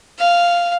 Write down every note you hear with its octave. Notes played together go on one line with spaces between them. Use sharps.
F5